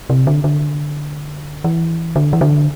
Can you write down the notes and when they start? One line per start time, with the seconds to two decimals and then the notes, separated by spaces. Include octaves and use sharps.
0.10 C3
0.27 D3
0.44 D3
1.64 E3
2.16 D3
2.33 E3
2.41 D3